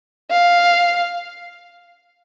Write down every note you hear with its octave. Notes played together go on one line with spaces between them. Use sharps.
F5